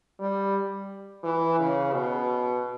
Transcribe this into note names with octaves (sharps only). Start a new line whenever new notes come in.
G3
E3
C#3
B2